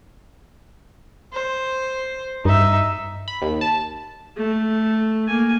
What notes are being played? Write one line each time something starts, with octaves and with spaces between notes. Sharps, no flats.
C5
G2 D#4 E5
B5
D#2
A5
A3
A#3 G#5